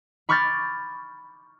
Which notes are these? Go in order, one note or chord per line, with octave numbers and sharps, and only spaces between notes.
B5 C#6 D6 F6 G6 A6